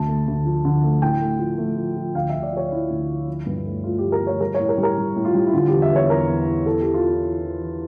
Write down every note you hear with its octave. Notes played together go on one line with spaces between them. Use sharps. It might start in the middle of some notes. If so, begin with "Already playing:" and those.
Already playing: D2 A5
A3
D2
F3
D3
A3
A2 G5
A3
F3
A3
F3
F3
D2 F5
D2 E5
D5
F3 C#5
F3 E4
D2
F3
F3
G2
A3
A3 F4
F3 G4
A#4
A3
C#5
G3 A#4
A2 C#5
A#4
G3
A#4
G3
A2
F4
G3
E4
D3 F4
E2 G4
E5
E2 C#5
E2 A#4
E2
E2
E3 A4
E3 G4
F4
E3
E4
E3
E3
E3